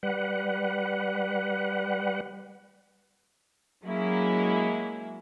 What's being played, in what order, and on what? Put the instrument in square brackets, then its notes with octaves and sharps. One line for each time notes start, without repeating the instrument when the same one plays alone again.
[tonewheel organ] G3 B4 F#5
[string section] F#3 G#3 A#3 C#4 E4